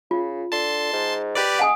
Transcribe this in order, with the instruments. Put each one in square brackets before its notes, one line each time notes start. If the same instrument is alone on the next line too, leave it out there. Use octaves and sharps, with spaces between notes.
[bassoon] C#3 [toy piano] F4
[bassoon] D3 [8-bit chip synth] A5 C6
[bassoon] G#2
[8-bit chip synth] G4 B4 D5
[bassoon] G#3 [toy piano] F#5 G#5 D#6